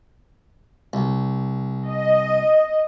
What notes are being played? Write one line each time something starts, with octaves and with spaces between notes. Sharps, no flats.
C2
D#5